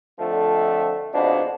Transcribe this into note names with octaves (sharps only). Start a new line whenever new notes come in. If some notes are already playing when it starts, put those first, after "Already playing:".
F2 D3 F3 A3
F2 G#2 B2 D4